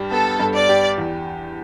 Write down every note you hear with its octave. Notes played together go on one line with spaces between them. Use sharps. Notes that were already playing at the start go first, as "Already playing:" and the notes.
Already playing: G2 G3 G4
B3 A4
G2
D5
G4
E2